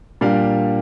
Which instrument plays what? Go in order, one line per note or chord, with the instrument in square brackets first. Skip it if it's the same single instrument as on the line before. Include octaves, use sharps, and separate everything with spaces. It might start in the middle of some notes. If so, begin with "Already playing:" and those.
[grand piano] A#2 G3 A#3 D4 F5